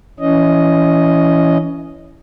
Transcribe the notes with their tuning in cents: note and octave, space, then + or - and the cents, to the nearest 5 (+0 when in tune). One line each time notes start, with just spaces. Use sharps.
E3 +10 C#4 +20 D#5 +0